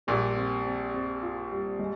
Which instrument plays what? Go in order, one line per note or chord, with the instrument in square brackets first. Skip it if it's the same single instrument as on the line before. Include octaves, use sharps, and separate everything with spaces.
[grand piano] A#1 A#2 [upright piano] G3
[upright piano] C4
C4
C4
F4
G3
G#3